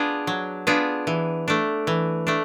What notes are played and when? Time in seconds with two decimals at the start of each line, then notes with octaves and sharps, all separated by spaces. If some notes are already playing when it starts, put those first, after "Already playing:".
Already playing: B3 D4 F4 G#4
0.27 F#3
0.67 B3 D4 F4 G#4
1.07 E3
1.48 A3 D4
1.87 E3
2.27 A3 D4